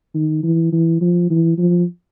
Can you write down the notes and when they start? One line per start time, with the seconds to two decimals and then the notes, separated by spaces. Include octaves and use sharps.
0.15 D#3
0.43 E3
0.72 E3
1.01 F3
1.30 E3
1.58 F3